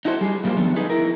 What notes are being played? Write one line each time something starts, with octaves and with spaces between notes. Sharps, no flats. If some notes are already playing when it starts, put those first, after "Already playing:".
D#4 E4 F#4 A4 C5
G3 G#4
A#2 G3 A#3 F4 C5
D3 D#3 F3 A3 B3
D#4 G#4 B4
E4 A#4